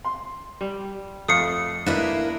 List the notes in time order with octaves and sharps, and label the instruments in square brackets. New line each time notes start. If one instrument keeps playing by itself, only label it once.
[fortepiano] C6
[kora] G3
[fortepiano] F2 [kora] A3 [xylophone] D#6 C7 C#7
[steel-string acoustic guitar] A#3 E4 A#4 [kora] D4 B4 D#5